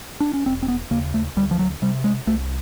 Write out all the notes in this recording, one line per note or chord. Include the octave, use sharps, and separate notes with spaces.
D4
C#4
E1 C4
C4
B3
D#2 C#3 A#3
A3
D2 G3
F3
F#3
C3 G3
G#3
C2 A3